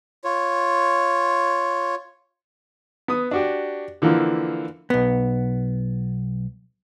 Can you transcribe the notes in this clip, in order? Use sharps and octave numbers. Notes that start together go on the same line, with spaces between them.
F4 C#5
B3 D#6
D4 F#4 G4
D3 E3 F3 A#3
B1 B3